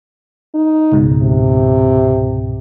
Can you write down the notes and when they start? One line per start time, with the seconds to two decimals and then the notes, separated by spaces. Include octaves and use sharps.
0.54 D#4
0.92 C#2 G#2 B2
1.22 C3